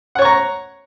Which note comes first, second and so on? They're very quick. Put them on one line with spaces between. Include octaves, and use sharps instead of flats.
F#5 C#5 C#6 A#5